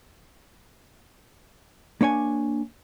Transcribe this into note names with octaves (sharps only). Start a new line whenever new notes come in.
A#3 D4 C#5 G#5